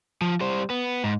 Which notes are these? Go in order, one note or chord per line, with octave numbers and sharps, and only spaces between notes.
F3
G3 C5
B3
G#2